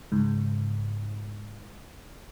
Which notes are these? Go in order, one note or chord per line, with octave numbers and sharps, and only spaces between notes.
C#2 G#2